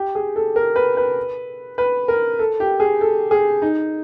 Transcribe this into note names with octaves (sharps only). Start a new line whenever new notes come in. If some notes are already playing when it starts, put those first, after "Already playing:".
Already playing: G4
G#4
A4
A#4
B4
B4
B4
A#4
A4
G4
G#4
A4
G#4
D#4